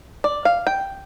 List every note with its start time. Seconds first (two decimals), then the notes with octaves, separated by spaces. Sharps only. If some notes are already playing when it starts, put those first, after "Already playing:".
0.24 D5
0.45 F5
0.67 G5